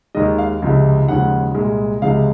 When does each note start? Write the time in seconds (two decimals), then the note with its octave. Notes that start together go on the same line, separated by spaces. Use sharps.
0.15 D#2 D#3 G#3 D#5
0.38 F5
0.62 C#2 C3 F3 G#3
1.08 D#2 C#3 F3 G#3 F#5
1.54 C2 A#2 G#3
2.02 C#2 C3 F3 G#3 F5